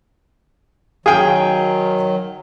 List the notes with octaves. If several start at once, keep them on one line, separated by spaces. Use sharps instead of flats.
D#3 F#3 G#4 F5 G5